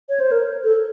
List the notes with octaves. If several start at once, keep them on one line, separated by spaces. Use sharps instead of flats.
C#5
C5
A#4
A4